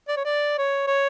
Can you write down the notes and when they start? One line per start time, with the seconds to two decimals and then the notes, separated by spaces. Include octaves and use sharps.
0.08 D5
0.17 C#5
0.24 D5
0.58 C#5
0.87 C#5